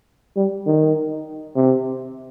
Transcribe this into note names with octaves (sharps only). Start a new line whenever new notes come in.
G3
D#3
C3